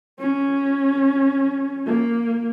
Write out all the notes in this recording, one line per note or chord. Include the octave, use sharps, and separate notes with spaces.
C#4
A#3